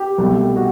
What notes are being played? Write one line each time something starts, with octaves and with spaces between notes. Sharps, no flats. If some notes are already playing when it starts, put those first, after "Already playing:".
Already playing: G4
C2 B2 A3
F#4